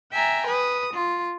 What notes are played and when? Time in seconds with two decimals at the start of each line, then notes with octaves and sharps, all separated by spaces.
0.12 E5 G5 G#5 A#5
0.47 B4 D#6
0.93 F4